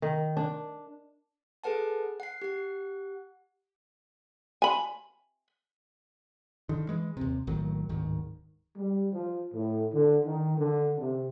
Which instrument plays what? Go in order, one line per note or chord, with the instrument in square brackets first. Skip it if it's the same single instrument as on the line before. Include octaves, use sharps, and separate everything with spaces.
[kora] D#3
D4
[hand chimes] G#4 A4 B4 F#5 A5
F#5 C7
G4 F#5
[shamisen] G#5 B5
[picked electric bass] D3 D#3
E3 G#3
D#2 C3
A#1 A2 D#3 F#3
D1 G#2 D#3
[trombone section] G3
F3
A2
D3
D#3
D3
C3